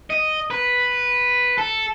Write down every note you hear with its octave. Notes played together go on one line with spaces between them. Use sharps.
D#5
B4
A4